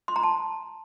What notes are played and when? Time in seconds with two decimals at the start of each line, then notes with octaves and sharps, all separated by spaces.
0.08 C6
0.16 A#5
0.23 A5